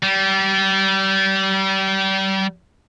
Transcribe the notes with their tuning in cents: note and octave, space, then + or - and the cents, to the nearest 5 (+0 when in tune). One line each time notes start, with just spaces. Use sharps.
G3 -30